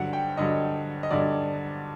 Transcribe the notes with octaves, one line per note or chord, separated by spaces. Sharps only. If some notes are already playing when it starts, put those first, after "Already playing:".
Already playing: G2 D3 F#3 F#5
G5
G2 D3 F#3 D#5
D#5
G2 D3 F#3 D5